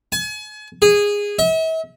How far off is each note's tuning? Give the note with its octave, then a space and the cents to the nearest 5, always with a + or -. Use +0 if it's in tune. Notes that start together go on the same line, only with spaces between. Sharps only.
G#5 +40
G#4 -15
E5 -40